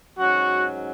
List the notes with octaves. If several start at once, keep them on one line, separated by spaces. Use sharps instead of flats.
G#2 F#3 C#4 F#4